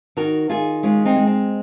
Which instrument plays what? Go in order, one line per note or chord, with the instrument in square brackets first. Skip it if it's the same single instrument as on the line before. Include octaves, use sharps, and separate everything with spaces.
[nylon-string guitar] D#3 F#4 A#4
D#3 F4 G#4
G#3 C#4 F4
C4 D#4
G#3
C4